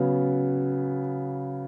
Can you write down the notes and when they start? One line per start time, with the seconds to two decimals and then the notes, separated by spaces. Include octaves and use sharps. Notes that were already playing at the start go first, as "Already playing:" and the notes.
Already playing: C#3 F#3 B3 C#4